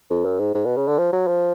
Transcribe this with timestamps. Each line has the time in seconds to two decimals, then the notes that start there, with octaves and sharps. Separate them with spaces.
0.10 F2
0.25 F#2
0.39 G#2
0.55 G#2
0.65 B2
0.77 C#3
0.88 D3
0.98 F3
1.13 F#3
1.27 F3